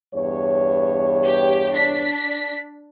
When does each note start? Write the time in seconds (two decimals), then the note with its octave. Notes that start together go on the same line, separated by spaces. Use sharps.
0.14 E2 G2 C#5
1.26 G4
1.74 D4 B6